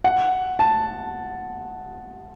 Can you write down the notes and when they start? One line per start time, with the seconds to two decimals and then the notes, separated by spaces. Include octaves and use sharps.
0.04 F#5
0.59 A5